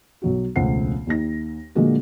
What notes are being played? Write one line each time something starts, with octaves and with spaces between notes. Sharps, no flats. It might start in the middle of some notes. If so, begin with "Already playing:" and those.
B1 F#3 F#4
E1 C#2 A3 C5 F#5 C7
D#2 D#4 A#6
A#2 D3 F3 G#3 A#3 F#4